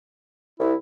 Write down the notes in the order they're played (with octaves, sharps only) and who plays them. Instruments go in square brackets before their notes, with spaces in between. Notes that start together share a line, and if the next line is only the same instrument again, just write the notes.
[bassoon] C2 [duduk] E4